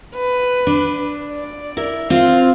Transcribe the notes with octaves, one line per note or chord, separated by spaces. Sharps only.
B4
D4
D5
E4 A#4
C4 F4 F5